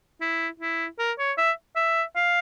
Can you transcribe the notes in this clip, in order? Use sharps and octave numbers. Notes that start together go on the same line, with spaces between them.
E4
E4
A#4
C#5
E5
E5
F5